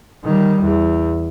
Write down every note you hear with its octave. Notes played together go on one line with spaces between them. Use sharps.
D#3 G3
E2